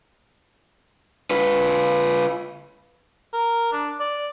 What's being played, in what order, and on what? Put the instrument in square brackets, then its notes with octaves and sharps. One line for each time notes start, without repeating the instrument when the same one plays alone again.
[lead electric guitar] F4 B4
[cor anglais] A#4
D4
D5